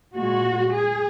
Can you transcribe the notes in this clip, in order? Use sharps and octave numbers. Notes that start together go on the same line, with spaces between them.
A#2 G#3 F#4
G#4